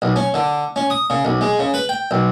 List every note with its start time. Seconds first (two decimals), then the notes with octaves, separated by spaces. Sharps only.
0.02 B1
0.16 C#4
0.34 D3
0.76 C#4
0.90 D#6
1.10 C#3
1.25 B1
1.41 G#3
1.59 C#3
1.74 B4
1.89 G5
2.11 B1